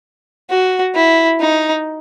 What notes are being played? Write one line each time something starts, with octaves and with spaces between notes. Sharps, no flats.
F#4
E4
D#4